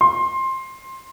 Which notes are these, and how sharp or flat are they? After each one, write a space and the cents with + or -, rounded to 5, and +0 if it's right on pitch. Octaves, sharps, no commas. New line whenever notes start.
C6 +15